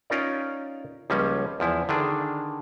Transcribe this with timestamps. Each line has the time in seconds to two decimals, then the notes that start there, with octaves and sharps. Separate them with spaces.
0.10 C#4 D#4 F4 A#4 D5
1.10 C#2 F3 G3 A#3 C#4
1.60 E2 F3 E4
1.89 D3 D#3 D4 G#4